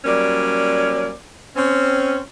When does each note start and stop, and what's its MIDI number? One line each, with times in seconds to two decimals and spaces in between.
0.05 1.12 54
0.05 1.12 55
0.05 1.12 58
0.05 1.12 61
0.05 1.12 74
1.56 2.19 60
1.56 2.19 61